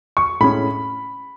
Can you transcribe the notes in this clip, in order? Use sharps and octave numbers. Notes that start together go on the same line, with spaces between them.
C#6
A2 G#3 C#4 B5